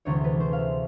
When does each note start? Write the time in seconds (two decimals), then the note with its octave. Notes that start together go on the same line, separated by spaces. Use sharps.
0.05 D2 C3 E3 G#3 C#5
0.24 B4
0.40 C5
0.53 F5
0.59 E5